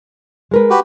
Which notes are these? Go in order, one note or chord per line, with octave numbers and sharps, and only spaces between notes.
G#3 A#4 B4
F#4 G4 B4